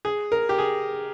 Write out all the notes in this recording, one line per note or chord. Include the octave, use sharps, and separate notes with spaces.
G#4
A#4
G4
G#4